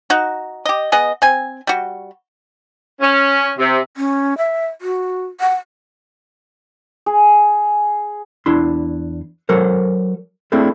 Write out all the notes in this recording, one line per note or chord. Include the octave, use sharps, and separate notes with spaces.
D#4 F#4
G4 D#5
B3 G#4 D#5
C4 G#5
G3 F#4
C#4
C3
C#4
E5
F#4
F#5
G#4
E2 D4 E4 C6
F#3 A4 A#4 C5
A3 C4 D4 E4 G#4 A4